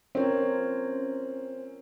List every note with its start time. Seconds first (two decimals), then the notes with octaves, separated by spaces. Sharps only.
0.15 C4 C#4 F4 A#4 C#5